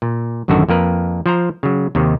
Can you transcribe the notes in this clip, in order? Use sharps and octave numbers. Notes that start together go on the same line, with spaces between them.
A#2
A1 F#2 D3 D#3 F#4 A4
F2 A#3 A#4 B4
F3 C5 A#5
C#3 F#3
D#2 C3 D#3